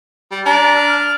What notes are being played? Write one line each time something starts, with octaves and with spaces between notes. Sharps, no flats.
G3
D4 A#5
F6